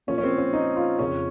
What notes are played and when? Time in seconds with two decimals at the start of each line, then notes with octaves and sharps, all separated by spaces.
0.07 A#2 F3 C#4
0.18 C#4
0.24 C4
0.38 C#4
0.53 D#4
0.76 F4
0.99 F2 C#3 F3 C#4